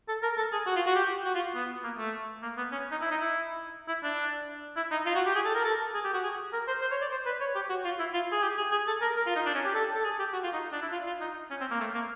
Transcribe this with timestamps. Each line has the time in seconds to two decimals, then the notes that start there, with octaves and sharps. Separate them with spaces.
0.08 A4
0.23 A#4
0.37 A4
0.53 G#4
0.66 F#4
0.76 F4
0.86 F#4
0.95 G4
1.25 F#4
1.35 F4
1.55 B3
1.84 A#3
1.98 A3
2.43 A#3
2.57 B3
2.72 C#4
2.91 D#4
3.01 E4
3.11 D#4
3.21 E4
3.88 E4
4.03 D4
4.77 E4
4.91 D#4
5.06 F4
5.15 F#4
5.26 G4
5.35 G#4
5.45 A4
5.55 A#4
5.64 A4
5.94 G#4
6.04 G4
6.14 F#4
6.24 G#4
6.53 A#4
6.67 C5
6.81 C5
6.91 C#5
7.01 D5
7.11 C5
7.26 B4
7.41 C#5
7.55 G4
7.69 F#4
7.84 F4
7.99 E4
8.13 F4
8.32 G#4
8.42 G4
8.57 G#4
8.72 G#4
8.87 A4
9.01 A#4
9.16 A#4
9.27 F4
9.36 D#4
9.46 D4
9.55 C#4
9.65 G4
9.75 A4
9.95 A4
10.05 G#4
10.19 G4
10.33 F#4
10.43 F4
10.53 D#4
10.72 D4
10.82 E4
10.92 F4
11.06 F4
11.21 D#4
11.51 C#4
11.61 C4
11.71 A#3
11.80 A3
11.94 A#3